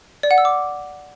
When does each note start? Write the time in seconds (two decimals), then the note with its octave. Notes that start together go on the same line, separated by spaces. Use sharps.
0.23 D5
0.31 F#5
0.38 E6
0.45 D6